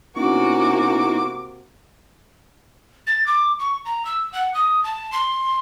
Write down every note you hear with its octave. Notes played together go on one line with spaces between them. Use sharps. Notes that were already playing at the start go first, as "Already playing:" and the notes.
C3 A#3 B3 C#4 D#4 E4 F#4 D6
A6
D6
C#6
A#5
E6
F#5
D#6
A5
C6